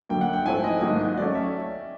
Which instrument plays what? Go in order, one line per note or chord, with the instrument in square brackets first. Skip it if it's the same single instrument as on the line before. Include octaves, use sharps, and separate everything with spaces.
[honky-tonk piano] F#2 D3 F#3 A#3 [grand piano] G5
[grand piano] F#5
G5
[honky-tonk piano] G#2 F3 A3 C4 E4 [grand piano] G#5
[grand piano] D#5
[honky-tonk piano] G#2 D#3 F#3 A#3 [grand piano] D#5
[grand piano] D#5
[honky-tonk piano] F#3 A3 C#4 [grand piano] D5
[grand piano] E5